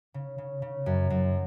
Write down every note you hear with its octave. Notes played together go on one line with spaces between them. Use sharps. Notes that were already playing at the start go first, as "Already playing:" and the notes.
C#3
C#3
C#3
F#2
F#2